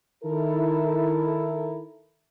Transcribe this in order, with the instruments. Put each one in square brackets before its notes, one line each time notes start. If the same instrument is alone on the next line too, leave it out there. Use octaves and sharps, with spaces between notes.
[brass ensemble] D#3 E4 A4 A#4